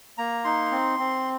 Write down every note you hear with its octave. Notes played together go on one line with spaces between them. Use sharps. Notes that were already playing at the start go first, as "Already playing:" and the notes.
A#3 A#5
D#4 C6
C4
C4